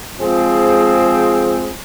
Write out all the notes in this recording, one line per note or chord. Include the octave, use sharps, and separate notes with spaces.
F3 G#3 C4 G#4